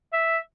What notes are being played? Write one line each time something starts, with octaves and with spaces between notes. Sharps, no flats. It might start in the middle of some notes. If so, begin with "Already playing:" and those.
E5